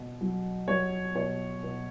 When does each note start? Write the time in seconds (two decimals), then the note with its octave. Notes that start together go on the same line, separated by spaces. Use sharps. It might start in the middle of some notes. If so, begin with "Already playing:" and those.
Already playing: B2
0.21 F#3
0.68 F#3 C#5
1.15 B2 C#5
1.63 B2